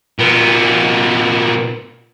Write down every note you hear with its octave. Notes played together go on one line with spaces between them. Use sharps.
A#2 B3